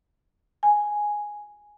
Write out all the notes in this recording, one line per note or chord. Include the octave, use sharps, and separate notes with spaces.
G#5